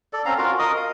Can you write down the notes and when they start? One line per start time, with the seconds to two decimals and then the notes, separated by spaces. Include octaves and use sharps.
0.13 A4 D5
0.26 C4 C#4 F5 A#5
0.38 F4 F#4 A#4 F5
0.59 A#4 D#5 D#6
0.77 F5